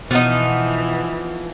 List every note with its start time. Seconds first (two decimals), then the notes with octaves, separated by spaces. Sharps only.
0.11 B2 E3 F3 B3 D#4